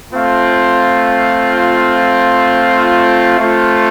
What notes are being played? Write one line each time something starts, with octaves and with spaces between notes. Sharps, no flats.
A3 C4 F4
A3 C4 F4